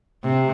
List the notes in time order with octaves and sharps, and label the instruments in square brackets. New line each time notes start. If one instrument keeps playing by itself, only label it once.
[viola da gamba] C3